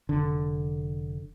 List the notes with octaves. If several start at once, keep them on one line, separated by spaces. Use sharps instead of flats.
F1 D3